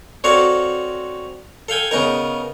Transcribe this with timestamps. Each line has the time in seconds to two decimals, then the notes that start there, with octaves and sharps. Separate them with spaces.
0.24 C4 F#4 A4 C#5 D5 F5
1.69 A4 F5 G5 G#5
1.91 C#3 B3 D#4 A#4